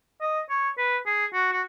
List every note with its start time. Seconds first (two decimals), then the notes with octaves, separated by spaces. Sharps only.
0.22 D#5
0.50 C#5
0.78 B4
1.06 G#4
1.34 F#4
1.52 F#4